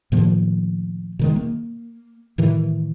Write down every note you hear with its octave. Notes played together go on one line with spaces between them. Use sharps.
A2 D#3 F3 A#3
B2 D#3 G#3
A#3
A2 D#3 E3